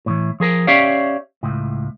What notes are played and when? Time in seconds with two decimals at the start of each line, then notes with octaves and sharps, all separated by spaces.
0.06 A2 C#3 E3
0.40 F3 G#4 A#4
0.67 C#4 G4 C#5 D5 E5 F5
1.43 C#2 A2